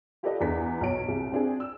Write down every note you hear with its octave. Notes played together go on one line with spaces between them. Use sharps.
F4 G4 A4 B4 D5 D#5
E2 D4 G#4 B4 B6
B1 C#5 D7
C2 G#4
C4 D4 G#4
E6